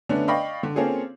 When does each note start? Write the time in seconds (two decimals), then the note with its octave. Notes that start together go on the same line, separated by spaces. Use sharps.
0.09 D3 A3 B3 C#4 D4
0.28 D5 D#5 F5 G5 B5 C#6
0.63 D3
0.76 A#3 C4 C#4 F4 G#4 A4